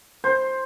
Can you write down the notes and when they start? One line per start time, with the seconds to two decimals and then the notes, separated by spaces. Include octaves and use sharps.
0.24 C5